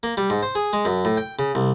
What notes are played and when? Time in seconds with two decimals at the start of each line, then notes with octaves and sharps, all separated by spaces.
0.03 A#3
0.17 G3
0.30 G#2
0.43 C5
0.55 G#4
0.73 G#3
0.85 F#2
1.05 A2
1.17 G5
1.39 C#3
1.55 C2